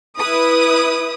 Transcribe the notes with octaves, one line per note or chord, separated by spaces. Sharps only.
E4 B4 D#6